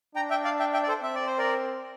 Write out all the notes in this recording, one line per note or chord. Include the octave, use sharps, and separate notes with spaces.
D4 G5 A#5
E5 G5
D5 F5
E5 G5
E5 G5
D5
A4 C5
C4 E5
D5
C5
A#4 D5